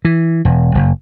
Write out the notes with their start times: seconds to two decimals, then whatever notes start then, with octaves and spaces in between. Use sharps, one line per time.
0.05 E3
0.45 E1
0.75 F#1